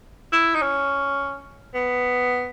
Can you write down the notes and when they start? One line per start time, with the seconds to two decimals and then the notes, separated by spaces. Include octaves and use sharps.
0.33 E4
0.55 D#4
0.62 C#4
1.74 B3